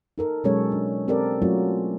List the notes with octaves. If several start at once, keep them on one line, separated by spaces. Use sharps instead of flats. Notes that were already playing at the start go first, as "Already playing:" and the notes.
D#4 A4 A#4
B2 F#3 G#3 C#4 A4 C#5
D4
C4 G4 A4 A#4 D5
F#3 A3 C#4 F4 F#4